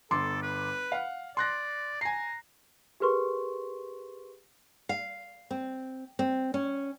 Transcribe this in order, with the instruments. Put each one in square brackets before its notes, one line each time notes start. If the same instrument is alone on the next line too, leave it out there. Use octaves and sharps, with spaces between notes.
[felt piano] G1 C6 D6 [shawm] A4
[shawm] B4
[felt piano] F5 F#5
[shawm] D5 [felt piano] C6 F#6 A#6
[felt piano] G#5 C7 [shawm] A#5
[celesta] G4 G#4 A#4 B4 C6 C#6
[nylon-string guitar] F5
C4
C4
C#4